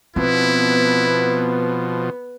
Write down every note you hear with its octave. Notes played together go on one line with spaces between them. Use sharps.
B2 F3 B3 C4 E4